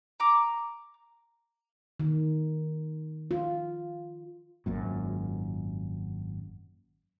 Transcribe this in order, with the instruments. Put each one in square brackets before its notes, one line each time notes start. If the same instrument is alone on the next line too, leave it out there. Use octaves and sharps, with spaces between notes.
[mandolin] A#5 D6
[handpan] D#3
F4
[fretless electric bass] G#1 F#2 A#2